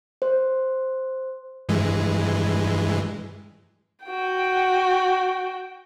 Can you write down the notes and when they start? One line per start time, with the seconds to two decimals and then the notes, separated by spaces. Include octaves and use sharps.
0.22 C5
1.69 G2 E3 G#3
4.06 F#4 G5